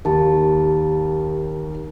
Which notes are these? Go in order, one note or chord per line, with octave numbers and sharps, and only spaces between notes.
D#2 G4 A5